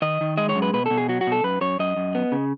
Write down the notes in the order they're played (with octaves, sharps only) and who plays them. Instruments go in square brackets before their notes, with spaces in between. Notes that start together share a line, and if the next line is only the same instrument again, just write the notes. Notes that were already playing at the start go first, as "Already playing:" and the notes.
[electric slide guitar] D#3 D#5
D#3
G#3 D#5
C#5
F#2
B4
B2 B4
B2 A4
G#4
F#3 F#4
F#4
B2 A4
F#2 B4
F#2 C#5
F#2 D#5
F#2
B3
C#3